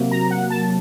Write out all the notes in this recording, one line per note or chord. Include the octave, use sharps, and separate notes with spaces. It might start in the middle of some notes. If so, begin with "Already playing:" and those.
Already playing: C3 F#3 A#3
A#5
F#5
A5